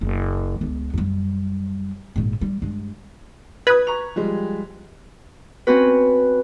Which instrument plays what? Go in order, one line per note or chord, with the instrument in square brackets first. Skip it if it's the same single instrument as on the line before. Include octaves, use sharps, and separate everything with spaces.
[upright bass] F#1 C#3
C#2 B3
F#2 G3
G#1 A#2
G3
G2 G#3
[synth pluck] B4 [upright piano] D#6 F#6 G#6
[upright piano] A#5 C#6 F7
F3 G3 G#3
[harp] C4 C#4 F#4 B4